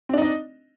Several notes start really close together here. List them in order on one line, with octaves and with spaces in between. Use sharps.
C4 D4 D#4 D#5